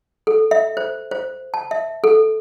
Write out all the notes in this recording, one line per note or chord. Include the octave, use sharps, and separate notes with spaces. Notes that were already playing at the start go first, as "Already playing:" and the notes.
A4
E5
C5
C5
A5
E5
A4